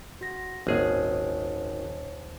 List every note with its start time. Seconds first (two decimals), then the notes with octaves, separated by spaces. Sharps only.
0.21 F#4 A#6
0.67 D#1 G#1 C#4 G#4 C#5 D#5